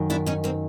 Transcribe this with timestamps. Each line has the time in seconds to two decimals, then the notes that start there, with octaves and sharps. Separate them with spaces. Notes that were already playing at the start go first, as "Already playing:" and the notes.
Already playing: F#2 D#3
0.10 D4 E4
0.26 C#4 D#4
0.44 A#3 C4